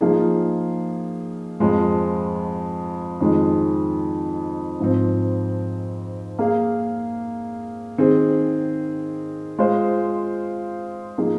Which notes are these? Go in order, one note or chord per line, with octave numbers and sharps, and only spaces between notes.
F3 A#3 D#4 G#4
F2 F3 G#3
F2 D#3 G#3
G#2 F3 C4
A#3 G#4 F5
D#3 C4 G#4
G#3 F4 C5
F3 A#3 D#4 G#4